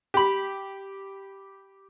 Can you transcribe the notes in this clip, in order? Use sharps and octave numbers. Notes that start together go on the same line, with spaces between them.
G4 B5